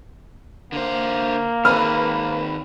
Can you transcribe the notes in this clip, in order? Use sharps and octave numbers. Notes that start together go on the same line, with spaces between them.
D3 A#3 C5
D#3 C4 G#4 B4 F6